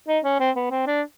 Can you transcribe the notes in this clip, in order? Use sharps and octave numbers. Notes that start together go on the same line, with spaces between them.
D#4
C#4
C4
B3
C4
D4